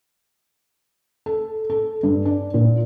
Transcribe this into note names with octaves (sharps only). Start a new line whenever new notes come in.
A4
A4
G2
D4
A#2